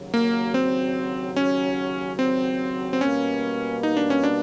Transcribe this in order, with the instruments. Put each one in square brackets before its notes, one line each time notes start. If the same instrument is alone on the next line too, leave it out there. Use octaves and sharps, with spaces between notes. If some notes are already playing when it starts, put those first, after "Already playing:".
Already playing: [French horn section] D#2 C#3 F#3
[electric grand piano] A#3
C4
C#4
C4
C4
[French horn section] B2 G3 A#3 [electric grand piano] C#4
[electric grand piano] D#4
D4
C#4
D4